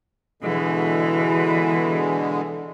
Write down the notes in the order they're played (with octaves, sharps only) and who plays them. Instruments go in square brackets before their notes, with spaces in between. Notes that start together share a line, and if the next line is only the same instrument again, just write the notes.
[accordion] B2 D3 G#3 [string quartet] E3